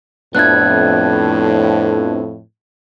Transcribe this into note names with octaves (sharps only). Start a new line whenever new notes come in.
F2 A2 B3 D4 E4 F#6 G#6